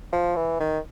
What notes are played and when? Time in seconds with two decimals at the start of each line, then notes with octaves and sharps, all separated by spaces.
0.12 F3
0.36 E3
0.60 D#3